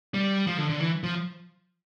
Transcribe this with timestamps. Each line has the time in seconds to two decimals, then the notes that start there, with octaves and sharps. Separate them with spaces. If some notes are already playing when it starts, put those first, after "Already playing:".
0.14 G3
0.47 F3
0.58 D3
0.70 D3
0.80 E3
1.03 F3